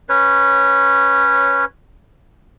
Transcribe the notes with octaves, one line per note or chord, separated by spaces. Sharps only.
C#4 B4 C#5